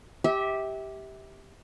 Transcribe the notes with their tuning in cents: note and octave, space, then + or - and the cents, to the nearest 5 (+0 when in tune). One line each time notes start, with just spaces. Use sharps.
G4 +0 E5 -30